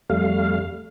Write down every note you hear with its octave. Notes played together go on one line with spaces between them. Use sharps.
F2 G3 A3 F5